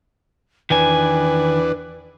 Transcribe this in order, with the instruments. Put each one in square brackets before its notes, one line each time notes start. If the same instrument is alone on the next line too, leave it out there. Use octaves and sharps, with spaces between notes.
[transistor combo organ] E2 D4 [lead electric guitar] D#3 G#5 [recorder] B4